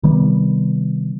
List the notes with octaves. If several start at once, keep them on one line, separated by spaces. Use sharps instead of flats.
C3 D#3 G3 B3